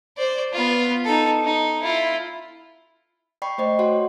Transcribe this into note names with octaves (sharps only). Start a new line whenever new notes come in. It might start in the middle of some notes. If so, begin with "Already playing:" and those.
C5 D5
B3 F4
D#4 A4
D#4
E4 F4
D5 G5 B5 C#6 C7
A3 C5 D5 D#5 G5
F#4 C#5 D5 F#5 C6